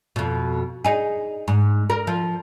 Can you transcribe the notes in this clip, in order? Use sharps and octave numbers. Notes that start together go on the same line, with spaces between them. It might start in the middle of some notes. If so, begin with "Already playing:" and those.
F2 B2
D#4 G#4
G#2
A#4
F3